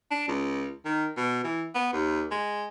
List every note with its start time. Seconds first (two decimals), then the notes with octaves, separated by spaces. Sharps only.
0.11 D4
0.28 C#2
0.85 D#3
1.17 B2
1.44 E3
1.75 B3
1.93 D#2
2.31 G#3